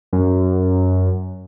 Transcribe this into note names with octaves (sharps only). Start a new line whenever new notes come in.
F#2